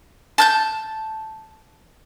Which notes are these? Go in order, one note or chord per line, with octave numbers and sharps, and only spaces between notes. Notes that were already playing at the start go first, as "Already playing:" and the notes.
A5 F#6 G6